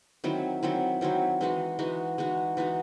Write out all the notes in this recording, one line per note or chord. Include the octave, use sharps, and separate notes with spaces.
D#3 F#3 C4 E4
D#3 F#3 C4 E4
D#3 F#3 C4 E4
E3 G#3 D#4 F#4
E3 G#3 D#4 F#4
E3 G#3 D#4 F#4
E3 G#3 D#4 F#4